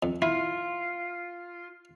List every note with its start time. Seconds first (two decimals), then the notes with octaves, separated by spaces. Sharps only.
0.03 F2
0.22 E4 F4